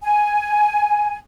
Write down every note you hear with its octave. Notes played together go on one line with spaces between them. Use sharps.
G#5